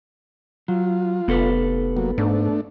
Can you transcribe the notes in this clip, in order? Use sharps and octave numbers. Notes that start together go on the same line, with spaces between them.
F#3 F4
F1 B3 A4 B4
F#3 A#3
G#2 A3 D4